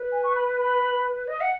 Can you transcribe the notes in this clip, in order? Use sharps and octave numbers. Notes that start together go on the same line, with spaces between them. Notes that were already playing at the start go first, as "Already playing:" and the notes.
Already playing: B4
G#5
C#6
B5
B5
D#5
F#5